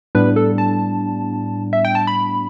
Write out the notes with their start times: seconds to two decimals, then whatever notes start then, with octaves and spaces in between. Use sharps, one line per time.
0.15 A2 G3 B3 D4 B4
0.36 A4
0.58 A5
1.73 E5
1.85 G5
1.95 A5
2.07 B5